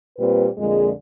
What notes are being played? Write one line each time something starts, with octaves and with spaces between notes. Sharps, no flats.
A#2 G3 C4 B4
F2 A#2 D3 G#3